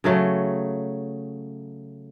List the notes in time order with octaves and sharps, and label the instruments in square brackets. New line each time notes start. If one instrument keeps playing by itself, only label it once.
[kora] C#3 F#3 A3